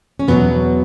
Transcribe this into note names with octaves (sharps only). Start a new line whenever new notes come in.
C#4
E2 B2 F#3 B3